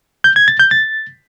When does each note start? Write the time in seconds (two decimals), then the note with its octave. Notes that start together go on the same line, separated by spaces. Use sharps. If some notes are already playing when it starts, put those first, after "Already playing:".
0.24 G6
0.36 G#6
0.48 A6
0.59 G6
0.71 A6